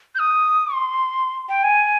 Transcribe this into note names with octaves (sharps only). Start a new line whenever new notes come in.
G6
D#6
C6
G5
G#5